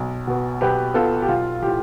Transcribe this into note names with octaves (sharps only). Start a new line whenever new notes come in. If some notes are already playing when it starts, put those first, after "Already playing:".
Already playing: B1
B2 B3
B1 G4 B4
B2 B3 F4 A4
G4
B1 F4
A2 F3 G4